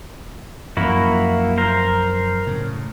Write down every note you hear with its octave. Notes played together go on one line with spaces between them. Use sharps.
F#2 F3 A#3 E4 F#4
A#4 C5
A2 C#3